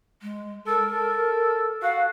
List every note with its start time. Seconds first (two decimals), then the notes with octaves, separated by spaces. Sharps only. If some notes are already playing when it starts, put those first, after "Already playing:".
0.22 G#3
0.67 A4 A#4
0.92 A4
1.83 F#4 F5